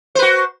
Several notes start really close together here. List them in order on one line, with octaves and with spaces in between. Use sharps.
C5 B4 F#4